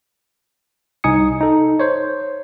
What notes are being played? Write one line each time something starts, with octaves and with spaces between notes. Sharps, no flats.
C2 D#4 G#5 D#6 C#7
D#4 A4
C5 C#5